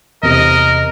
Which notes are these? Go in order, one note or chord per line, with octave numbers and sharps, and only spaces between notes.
E2 C3 A#4 D#5